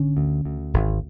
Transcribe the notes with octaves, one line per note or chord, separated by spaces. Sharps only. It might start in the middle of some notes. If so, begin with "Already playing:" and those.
Already playing: G#1 D3 C#4
D2
D2
G#1